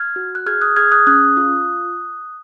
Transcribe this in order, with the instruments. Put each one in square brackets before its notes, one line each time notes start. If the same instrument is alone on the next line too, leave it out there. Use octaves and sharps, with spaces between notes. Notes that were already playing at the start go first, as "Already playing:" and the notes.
Already playing: [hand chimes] F6 G#6
F#4
F#6
G#4 F6 G#6
D#6 F#6
G#4 F6 G#6
D#6 F#6
C#4 D#6 F#6
F4